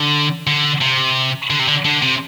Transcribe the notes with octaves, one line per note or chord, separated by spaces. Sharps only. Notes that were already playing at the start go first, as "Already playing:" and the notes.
Already playing: D3
D3
C3
D3
C3
D3
D3
C3